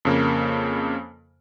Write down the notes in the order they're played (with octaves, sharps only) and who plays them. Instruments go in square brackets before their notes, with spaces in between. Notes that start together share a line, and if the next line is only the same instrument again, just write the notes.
[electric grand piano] F2 C#3 A#3